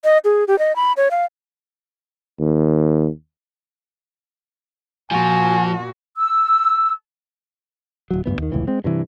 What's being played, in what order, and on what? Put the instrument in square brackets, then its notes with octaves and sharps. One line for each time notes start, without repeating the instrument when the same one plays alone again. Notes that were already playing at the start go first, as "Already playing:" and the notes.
[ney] D#5
G#4
G4
D#5
B5
C#5
F5
[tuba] D#2
[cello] A#2 F#4 [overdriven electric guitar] F3 [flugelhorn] G#5
[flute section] E6
[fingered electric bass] D1 F#3
D2 G2 E3 B3
D#2 D#3
F1 C#2 A2 E3
G#3 C4
G2 C3 E3